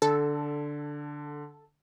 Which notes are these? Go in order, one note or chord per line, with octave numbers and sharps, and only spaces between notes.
D3 A4